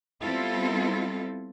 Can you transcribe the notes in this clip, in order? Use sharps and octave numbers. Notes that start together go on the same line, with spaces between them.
G3 B3 C4 E4 F4 A4